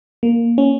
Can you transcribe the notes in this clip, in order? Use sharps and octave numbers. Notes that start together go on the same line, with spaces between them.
A#3
C#4